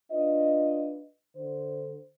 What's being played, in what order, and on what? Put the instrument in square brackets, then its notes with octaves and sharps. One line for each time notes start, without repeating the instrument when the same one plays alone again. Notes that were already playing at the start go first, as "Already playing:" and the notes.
[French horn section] D4 F4 B4 D#5
D3 C5